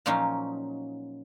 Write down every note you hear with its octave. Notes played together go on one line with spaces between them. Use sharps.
A#2 F3 F#3 C#4 D#4